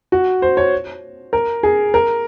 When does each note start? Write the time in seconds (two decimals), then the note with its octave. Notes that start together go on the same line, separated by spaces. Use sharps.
0.12 F#4
0.42 C5
0.57 C#5
1.33 A#4
1.63 G#4
1.94 A#4